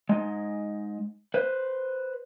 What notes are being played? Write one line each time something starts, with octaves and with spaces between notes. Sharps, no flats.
G#3 D#4
B4 C5